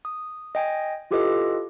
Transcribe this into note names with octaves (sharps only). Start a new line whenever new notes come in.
D#6
D#5 G5 G#5
E4 F4 G4 A4 B4 D#5